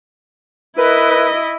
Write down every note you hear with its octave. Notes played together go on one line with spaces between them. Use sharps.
E4 A#4 B4 D#5